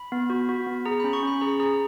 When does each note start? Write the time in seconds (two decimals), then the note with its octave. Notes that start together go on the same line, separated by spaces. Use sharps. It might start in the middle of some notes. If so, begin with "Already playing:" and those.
Already playing: B5
0.12 B3
0.30 F#4
0.49 F#4
0.67 B3
0.86 G#4 A#5
1.00 C#4 B5
1.13 C#6
1.23 C#4 B5
1.41 G#4 A#5
1.60 G#4 A#5